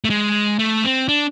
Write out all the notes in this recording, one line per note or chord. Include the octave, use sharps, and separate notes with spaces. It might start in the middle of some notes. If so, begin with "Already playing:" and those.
A3
G#3
A3
C4
D4